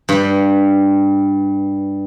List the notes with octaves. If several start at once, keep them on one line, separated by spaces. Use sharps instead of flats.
G2 G3